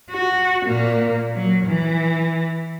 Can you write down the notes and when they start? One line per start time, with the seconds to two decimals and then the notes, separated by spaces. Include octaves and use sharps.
0.10 F#4
0.65 A#2 A#3
1.35 F#3
1.66 E3